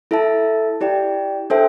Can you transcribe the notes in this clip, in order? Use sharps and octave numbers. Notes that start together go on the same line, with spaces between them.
E4 A4 E5 A5
E4 G4 D5 G5
D4 A4 C5 E5 G5